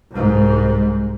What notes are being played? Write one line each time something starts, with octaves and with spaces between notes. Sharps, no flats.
C2 G#2